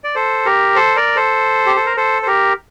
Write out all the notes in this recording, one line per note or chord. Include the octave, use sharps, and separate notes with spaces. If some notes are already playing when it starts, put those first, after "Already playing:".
D5
A4 C5
G4 A#4
A4 C5
A#4 D5
A4 C5
G4
A4
A#4
A4 C5
C5
G4 A#4